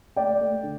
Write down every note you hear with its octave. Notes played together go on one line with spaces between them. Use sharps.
A3 D5 G5
A3
D3